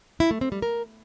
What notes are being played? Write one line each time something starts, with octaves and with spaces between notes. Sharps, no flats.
E4
A3
C4
G3
A#4